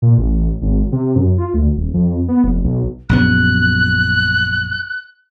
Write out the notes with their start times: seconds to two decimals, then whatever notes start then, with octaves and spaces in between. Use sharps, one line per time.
0.02 A#2
0.18 A1
0.62 G#1
0.92 C3
1.16 F#2
1.38 F4
1.54 D2
1.76 D#1
1.94 F2
2.28 B3
2.44 F1
2.64 B1
3.09 A#1 F#2 B3 F#6